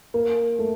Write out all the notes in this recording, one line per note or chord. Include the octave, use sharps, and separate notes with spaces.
A#3
A3